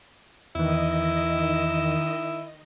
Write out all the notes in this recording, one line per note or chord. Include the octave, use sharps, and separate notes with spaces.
E2 D#3 E3 E4 D#5